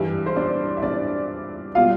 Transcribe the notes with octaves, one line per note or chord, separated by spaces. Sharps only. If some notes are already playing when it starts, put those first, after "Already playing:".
Already playing: G2 E3 G3 E4 E5
C5
D4 D5
E5
D4 D5
B2 G3 F4 F5